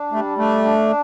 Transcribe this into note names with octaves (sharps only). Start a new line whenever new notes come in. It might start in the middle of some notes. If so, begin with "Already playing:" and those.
Already playing: D4
G3 A3
A3 D4
D4